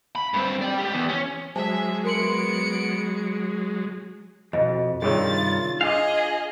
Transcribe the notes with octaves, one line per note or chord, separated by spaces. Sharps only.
B5
G2 C4
D5 G5
C#2 G4
E2
C#4
F#3 G#3 C5 E5 G#5 A5
B3 A#4 C6 C#7 D7 F#7
F2 B2 D#5
G2 C3 D#3 F4 G#4 C#5 A6
D4 G#4 D#5 F5 G#5 D6